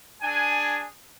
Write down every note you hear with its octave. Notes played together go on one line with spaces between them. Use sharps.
D4 G#4 G#5